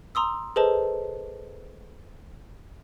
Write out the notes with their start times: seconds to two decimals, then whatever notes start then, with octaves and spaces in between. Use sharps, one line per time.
0.15 A#5 C6 D#6 E6
0.56 G#4 A4 B4 C5 D#5 A5